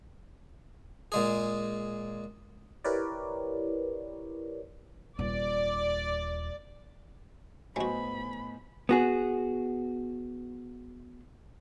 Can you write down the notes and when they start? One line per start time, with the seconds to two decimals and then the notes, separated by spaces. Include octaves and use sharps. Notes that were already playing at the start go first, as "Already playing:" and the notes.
1.12 A#2 G#3 G#4
2.84 E4 G4 A#4 B4 C#5 D5
5.19 D#1 D5
7.76 A2 F#3 B3 F#4 C5 D#5 G#5 B5
8.89 B3 F#4 G#4